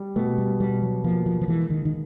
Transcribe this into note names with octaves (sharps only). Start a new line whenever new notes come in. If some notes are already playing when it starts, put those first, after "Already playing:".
Already playing: G3
B2 A3
G3
B2 G3
F#3
F3 A#3
F3
F3
E3 G#3
D#3
D#3